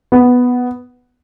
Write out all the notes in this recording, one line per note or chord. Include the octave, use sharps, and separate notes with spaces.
B3